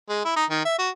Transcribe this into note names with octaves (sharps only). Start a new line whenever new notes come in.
G#3
E4
D#4
D#3
E5
F#4